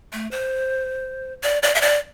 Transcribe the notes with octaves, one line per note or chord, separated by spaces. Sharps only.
A3
C5
D5
D5
E5
D5